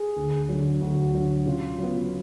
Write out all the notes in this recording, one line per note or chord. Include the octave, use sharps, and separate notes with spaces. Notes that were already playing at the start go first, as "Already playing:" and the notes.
Already playing: G#4
D2
D3 F#3
D2 F#4
D3 F#3
C#3 F4
F#3 B3